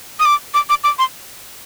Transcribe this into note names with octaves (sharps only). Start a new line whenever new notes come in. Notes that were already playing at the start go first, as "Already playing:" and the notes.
D#6
D6
D6
D6
D6
C6